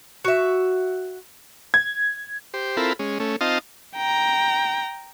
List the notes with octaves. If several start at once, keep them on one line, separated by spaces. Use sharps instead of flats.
F#4 E5
G#6
G4 C5
C4 E4 F4 A4 A#4 B5
G#3 C#4
A3 C#4
C4 D#4 F4 D#5 F5 A5
G5 A#5